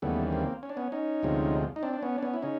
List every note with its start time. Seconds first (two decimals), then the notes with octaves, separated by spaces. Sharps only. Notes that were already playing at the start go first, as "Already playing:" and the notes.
0.02 D#2 C#3 E3 G3 A3 B3
0.32 A#3 C4
0.63 C#4
0.69 D4
0.77 B3 C#4
0.92 C#4 D#4
1.23 D2 C3 F3 G#3
1.76 D#4
1.83 C4 D4
1.93 D4
2.03 B3 C#4
2.18 D4
2.23 B3 C#4
2.34 E4
2.42 C#3 C#4 D#4